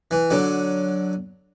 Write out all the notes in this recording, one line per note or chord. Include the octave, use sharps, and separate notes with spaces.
E3
D3 F#3